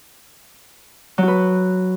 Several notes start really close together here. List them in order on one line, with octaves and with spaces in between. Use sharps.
F#3 F#4 B4